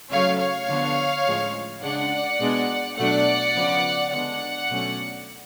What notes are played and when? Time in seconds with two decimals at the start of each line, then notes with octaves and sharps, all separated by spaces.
0.11 C#3 F#3 A3 C#5 F5
0.40 C#5 F5
0.68 D3 F3 B3 D4
1.25 A2 F3 G#3 C#4
1.82 C#3 G#3 D4 D5 F#5
2.40 B2 G#3 B3 D4
2.97 B2 F#3 A3 D4 D5 F#5
3.55 C#3 F3 B3
4.11 D3 G#3 B3 D4 D5 F#5
4.70 B2 F#3 A3 C#4